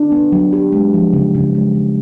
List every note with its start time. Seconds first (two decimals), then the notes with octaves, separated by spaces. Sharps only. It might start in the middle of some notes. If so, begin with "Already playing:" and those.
Already playing: D4
0.12 B3
0.32 F#3
0.53 G4
0.72 G#3
0.94 F3
1.13 C#3
1.35 C#3
1.55 G#3
1.75 F3